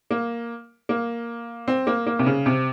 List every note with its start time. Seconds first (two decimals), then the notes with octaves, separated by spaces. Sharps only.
0.11 A#3
0.89 A#3
1.68 C4
1.87 A#3
2.07 A#3
2.19 C3
2.26 C#3
2.46 C3